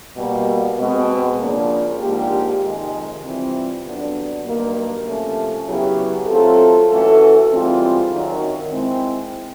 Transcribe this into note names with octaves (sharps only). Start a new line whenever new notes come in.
B2 G3 A#3
B2 G#3 C4
C#3 F3 A#3 D4
G#2 F3 A#3 D4 G4
F2 C3 D#3 G#3
C3 E3 G3 C4 F4
G2 D3 F#3 B3 D4
G2 D#3 F#3 A#3
C3 F3 A3 C#4
C#3 F#3 B3 E4 G4
F#3 A3 C4 F4 A4
E3 A3 C#4 F#4 A4
G#2 E3 G3 C4 F4
F#2 D#3 F#3
G#3 C4 E4